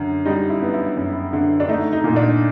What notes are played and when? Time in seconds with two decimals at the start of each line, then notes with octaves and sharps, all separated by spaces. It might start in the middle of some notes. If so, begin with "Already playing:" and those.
Already playing: F#2 D3
0.25 G3 D#4
0.50 E4
0.62 B3
0.74 E4
0.97 F#2
1.33 D3
1.60 D4
1.69 A3 D#4
1.93 D#4
2.04 A#2
2.16 D4